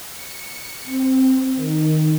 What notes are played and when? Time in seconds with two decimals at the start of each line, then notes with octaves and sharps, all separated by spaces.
0.11 C#7
0.85 C4
1.55 D#3